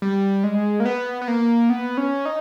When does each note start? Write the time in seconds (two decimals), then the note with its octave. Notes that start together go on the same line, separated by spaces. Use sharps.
0.02 G3
0.44 G#3
0.80 A#3
0.85 B3
1.21 B3
1.28 A#3
1.70 B3
1.98 C#4
2.26 D#4